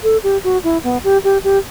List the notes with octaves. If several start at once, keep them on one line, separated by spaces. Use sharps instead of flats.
A4
G4
F#4
E4
B3
G4
G4
G4